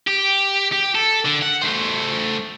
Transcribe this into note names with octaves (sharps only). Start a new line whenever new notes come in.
G4
G4
A4
D3
F#5
A3 C5